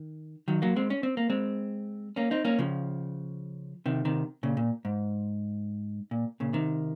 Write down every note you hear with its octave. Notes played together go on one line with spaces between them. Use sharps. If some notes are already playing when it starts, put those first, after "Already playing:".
Already playing: D#3
D#3 F#3
F#3 A#3
G#3 C4
C#4
C4
A#3
G#3 C4
A#3 C#4
C4 D#4
A#3 C#4
C#3 F3
C3 D#3
C3 D#3
A#2 C#3
A#2
G#2
A#2
A#2 C#3
C3 D#3